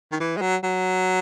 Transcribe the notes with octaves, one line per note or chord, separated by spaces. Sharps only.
D#3
E3
G#3
F#3
F#3